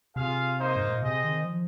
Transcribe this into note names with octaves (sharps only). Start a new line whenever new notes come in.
C3 F4 G#4 F5
A#3 D#4 C5
G#2
A#2
C3 C4 G#4 C5 D#5
D#3
F3